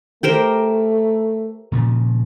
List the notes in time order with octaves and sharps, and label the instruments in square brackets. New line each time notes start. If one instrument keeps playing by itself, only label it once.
[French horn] A3 [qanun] G4 A#4 C5
[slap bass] A#2 C#3 F3